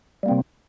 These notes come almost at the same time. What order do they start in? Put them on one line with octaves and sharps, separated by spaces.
G3 A#3 C4 C3